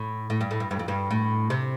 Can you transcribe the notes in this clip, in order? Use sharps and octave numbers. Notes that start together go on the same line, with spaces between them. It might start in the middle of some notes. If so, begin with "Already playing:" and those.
Already playing: A2
A2
G2
A2
G2
G2
F2
G2
A2
C3